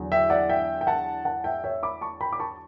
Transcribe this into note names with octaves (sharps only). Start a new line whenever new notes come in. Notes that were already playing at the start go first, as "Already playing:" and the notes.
Already playing: E2 D3 F#3
E5 G5
D5 F#5
E5 G5
G5
F#5 A5
F#5 A5
E5 G5
C#5 E5
B5 D6
A5 C#6
G5 B5
D6
A5 C#6